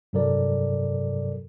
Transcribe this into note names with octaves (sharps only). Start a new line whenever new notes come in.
G2 C3 F#3 A4 A#4 D5